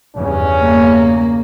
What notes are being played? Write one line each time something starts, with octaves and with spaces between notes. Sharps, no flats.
E2 G2 C#3 C#4
A#3